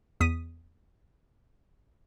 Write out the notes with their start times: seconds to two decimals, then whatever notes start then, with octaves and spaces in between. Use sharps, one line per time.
0.20 E2 D#6 B6 D#7